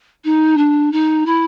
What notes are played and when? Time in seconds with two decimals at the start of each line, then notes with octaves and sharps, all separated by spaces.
0.24 D#4
0.57 D4
0.92 D#4
1.26 E4